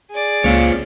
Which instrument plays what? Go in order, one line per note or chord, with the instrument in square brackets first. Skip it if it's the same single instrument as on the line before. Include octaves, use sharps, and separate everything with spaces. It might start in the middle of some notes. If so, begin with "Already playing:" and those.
[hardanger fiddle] G#4 D5
[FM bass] C#2 [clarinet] A#3 [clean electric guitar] C4 F4 C#5